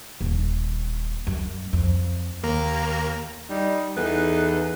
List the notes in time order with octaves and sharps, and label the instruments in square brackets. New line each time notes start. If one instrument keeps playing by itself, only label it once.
[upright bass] D#1
F#2
F2
[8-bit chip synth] D#2 A#3 A#5
[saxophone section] G3 D#4
E2 D#4 A4 B4